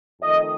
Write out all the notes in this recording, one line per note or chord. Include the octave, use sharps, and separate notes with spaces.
F2 D#3 A3 D#5